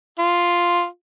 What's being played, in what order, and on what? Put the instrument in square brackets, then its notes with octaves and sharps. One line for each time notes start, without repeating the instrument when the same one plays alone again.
[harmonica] F4